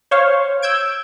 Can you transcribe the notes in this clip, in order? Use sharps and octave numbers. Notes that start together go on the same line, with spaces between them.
C5 C#5 F5
E6 G6 G#6 D7